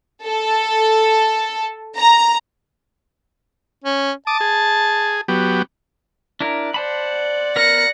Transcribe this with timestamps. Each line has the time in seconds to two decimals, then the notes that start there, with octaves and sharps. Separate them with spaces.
0.24 A4
1.96 A#5
3.84 C#4
4.27 A5 D6 D#6
4.41 G#4
5.28 F#3 B3 G4
6.40 D4 E4 A#4
6.74 C5 D5 F#5 A5 B5
7.56 B3 A#4 A#6 C#7